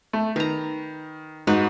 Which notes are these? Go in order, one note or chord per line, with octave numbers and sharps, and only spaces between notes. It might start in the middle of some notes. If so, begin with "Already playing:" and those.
A3
D#3 B4 A#5
G#2 D#4 F#4 B4